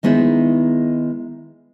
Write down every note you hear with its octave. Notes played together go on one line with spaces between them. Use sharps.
D#3 G#3 B3 D#4 E4